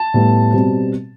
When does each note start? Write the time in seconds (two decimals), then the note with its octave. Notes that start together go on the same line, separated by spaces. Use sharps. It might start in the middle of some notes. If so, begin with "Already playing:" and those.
Already playing: A5
0.14 A2 G3 B3
0.53 B2 G3 C4